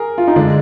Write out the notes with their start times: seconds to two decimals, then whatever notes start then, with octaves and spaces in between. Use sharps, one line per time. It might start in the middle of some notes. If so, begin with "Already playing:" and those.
Already playing: G#4 A#4
0.18 F4
0.27 D#4
0.36 D3 G#3 D4